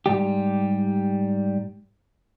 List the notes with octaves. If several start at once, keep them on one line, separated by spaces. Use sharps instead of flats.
G#2 G3 G4